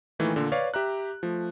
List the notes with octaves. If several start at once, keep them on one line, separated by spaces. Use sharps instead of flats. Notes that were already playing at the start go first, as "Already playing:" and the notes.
A#2 D#3 E3 A3
A#2 D3
B4 C#5 D5 F5
G4 E5 A#5 F#6
F3 A3